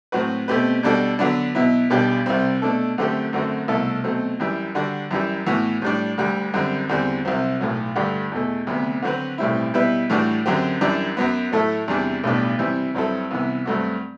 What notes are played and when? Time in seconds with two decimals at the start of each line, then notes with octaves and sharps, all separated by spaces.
0.12 A2 F#3 C4 F#4 B4
0.48 B2 A3 C4 G4 B4
0.83 B2 G3 D4 F#4 A4
1.19 D3 F#3 B3 D4
1.55 B2 F#3 B3 E4
1.90 B1 B2 G3 D4 G4
2.26 C2 C3 G3 C4
2.62 B2 A3 D4 A4
2.98 F#2 D3 A3 C4 G4
3.33 F#2 D3 A3 C4 F#4
3.68 C2 B2 A3 E4 A4
4.04 B2 F#3 A3 C4
4.40 F#2 E3 G3
4.75 D3 G3 D4 F#4
5.11 F#2 E3 G3
5.46 A2 E3 B3 F#4
5.82 A2 G3 D4
6.18 D2 D3 G3
6.54 F#2 D3 G3 C4
6.89 E2 D3 G3 C4
7.25 C2 C3 F#3 C4
7.60 B1 A2 F#3
7.95 G2 D3 A3 D4 G4
8.32 E2 B2 A3
8.67 D2 C3 F#3 B3
9.02 D3 F#3 C4 F#4 B4
9.38 B1 A2 G3 C4 E4
9.74 B2 G3 B3 E4 B4
10.10 A2 E3 G3 D4 F#4
10.46 F#2 D3 F#3 C4 G4
10.81 F#2 E3 G3 D4
11.17 F#2 F#3 B3
11.52 A2 F#3 A3 E4 A4
11.88 E2 C3 E3 G3 D4
12.23 B1 A2 G3 B3 D4
12.59 C3 E3 G3 C4
12.95 G2 F#3 C4 E4 A4
13.31 C2 C3 E3 B3
13.66 G2 F#3 A3 C4 F#4